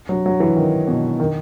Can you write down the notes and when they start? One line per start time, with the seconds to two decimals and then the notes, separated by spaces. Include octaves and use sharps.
0.09 F#3
0.26 F#3
0.40 E3
0.57 D#3
0.88 B2
1.20 D#3